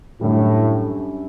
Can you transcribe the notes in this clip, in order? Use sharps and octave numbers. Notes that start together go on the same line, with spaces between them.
F#2 A2 D3 G3